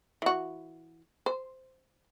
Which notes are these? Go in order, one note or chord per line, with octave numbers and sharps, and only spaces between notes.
E3 F#4
C5